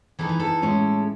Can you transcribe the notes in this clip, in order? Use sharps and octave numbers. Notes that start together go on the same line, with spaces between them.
E3 B3 D#4 A4
B4
A4
A2 G#3 C#4